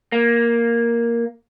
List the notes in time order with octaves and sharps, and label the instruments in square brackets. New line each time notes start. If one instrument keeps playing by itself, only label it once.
[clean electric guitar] A#3